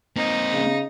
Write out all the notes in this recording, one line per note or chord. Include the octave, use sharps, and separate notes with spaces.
A#3 C4 D#4
C#3